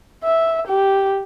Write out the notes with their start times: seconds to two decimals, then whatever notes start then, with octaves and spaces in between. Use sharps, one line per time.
0.24 E5
0.67 G4